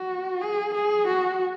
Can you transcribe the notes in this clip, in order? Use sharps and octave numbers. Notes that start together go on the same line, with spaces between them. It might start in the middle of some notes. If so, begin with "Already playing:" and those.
Already playing: F#4
G#4
G#4
F#4